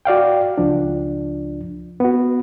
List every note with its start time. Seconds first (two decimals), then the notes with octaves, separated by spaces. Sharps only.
0.05 F#4 D5 F5 G5
0.58 C#2 F3 D4
2.00 B3 F#4